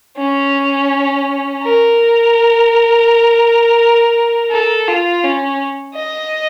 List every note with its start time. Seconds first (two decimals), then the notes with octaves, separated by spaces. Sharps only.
0.18 C#4
1.63 A#4
4.51 A4
4.87 F4
5.24 C#4
5.95 D#5